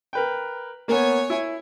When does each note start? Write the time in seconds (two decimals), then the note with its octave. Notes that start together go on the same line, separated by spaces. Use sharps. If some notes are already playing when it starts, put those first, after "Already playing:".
0.13 A#4 B4 G5
0.88 A#3 B3 C#5 G#5
1.30 E4